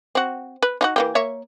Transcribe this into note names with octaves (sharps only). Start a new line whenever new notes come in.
C4 F#4
B4
D#4 F4 F#4
E3 A#3 G4
A#3 C#5 E5